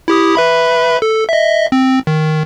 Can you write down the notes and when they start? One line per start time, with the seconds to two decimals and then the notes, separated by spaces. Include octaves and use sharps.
0.08 E4 G4 D#6
0.35 B4 E5 B5
1.02 A4
1.29 D#5 E5
1.72 C4
2.07 D#3